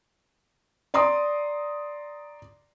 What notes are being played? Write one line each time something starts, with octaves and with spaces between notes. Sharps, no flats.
D5 A#5 C6 D6 D#6